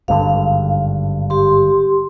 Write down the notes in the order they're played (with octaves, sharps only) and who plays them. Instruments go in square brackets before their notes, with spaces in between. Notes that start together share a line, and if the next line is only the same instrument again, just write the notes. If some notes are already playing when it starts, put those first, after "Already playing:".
[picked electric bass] G#1 G2 D3 [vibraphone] F5
[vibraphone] G4 C6